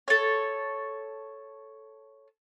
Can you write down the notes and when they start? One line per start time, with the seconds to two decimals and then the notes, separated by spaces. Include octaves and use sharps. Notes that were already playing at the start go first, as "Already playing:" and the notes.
0.08 A4 C#5